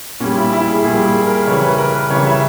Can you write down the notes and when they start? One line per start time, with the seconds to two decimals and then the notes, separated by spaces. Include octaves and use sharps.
0.20 A#2 G3 C#4
0.36 E4
0.53 E4
0.68 G#4
0.84 A#2 G3 G#4
1.05 G#4
1.26 A#4
1.47 C#3 E3 G3 C#5
1.63 B4
1.78 A#4
1.95 B4
2.10 C#3 E3 G3 C#5
2.27 E5